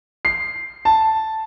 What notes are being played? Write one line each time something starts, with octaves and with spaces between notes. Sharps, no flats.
C7
A5